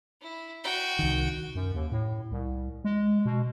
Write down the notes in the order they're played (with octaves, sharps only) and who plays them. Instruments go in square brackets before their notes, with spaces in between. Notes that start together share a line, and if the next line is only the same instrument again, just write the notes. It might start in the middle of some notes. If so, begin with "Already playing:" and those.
[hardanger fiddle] E4
F#4 G5
[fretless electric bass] C2 D#3
[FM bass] F#2
D#2
A2
C2
G#3
B2